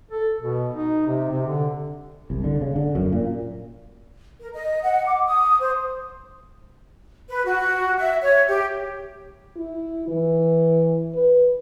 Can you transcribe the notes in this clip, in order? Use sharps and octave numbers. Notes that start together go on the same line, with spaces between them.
A4
B2
D#4
C3
C3
D3
C2
D3
C#3
D3
F#2
A#2
A#4
D#5
F#5
D6
D#6
C5
B4
F#4
E5
C#5
G4
E4
E3
B4